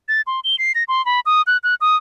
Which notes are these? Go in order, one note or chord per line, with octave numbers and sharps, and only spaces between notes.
A6
C6
G7
C7
A#6
C6
B5
D#6
F#6
F#6
D#6